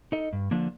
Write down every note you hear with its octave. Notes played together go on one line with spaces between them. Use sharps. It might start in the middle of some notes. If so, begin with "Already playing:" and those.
D#4 A4 D#5
G2
D3 F3 A#3 D4